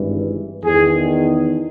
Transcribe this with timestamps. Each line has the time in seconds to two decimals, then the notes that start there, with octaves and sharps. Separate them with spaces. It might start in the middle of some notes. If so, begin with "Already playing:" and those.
Already playing: G#1 G2 E3
0.63 E2 D#3 G#4